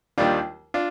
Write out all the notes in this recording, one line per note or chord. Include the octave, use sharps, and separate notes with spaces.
D#2 D#3 G3 D4 F4
D4 F4